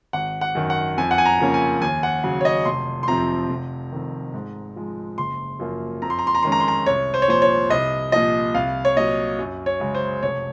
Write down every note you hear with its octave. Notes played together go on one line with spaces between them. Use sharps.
G#1 F#5
F#5
F#2 D#3
F#5
F2 G#5
F#5
G#5
A#5
C#3 F3 A#3 C#4
G#5
D#2 G#5
F#5
C#3 F#3
C#5
D#5
F1 C6
C6
F2 C3 F3 C4 A#5
F1
F2 D#3
G#2
F3 G#3
F#1 C6
F#2 F3 A#3
F2 A#5
C6
A#5
C6
A#5
D#3 G#3 C#4 C6
A#5
C6
A#5
C2 C#5
C5
C#5
A#2 F3 C5
C#5
C2 D#5
A#2 F3 D#5
C2 F5
C#5
A#2 F#3 D#5
F#2
C#5
C#3 G#3
C5
F1 C#5